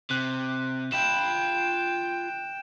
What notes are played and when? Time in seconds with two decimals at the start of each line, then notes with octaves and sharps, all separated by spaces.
0.11 C3 F#6
0.92 F4 G5 B5 E7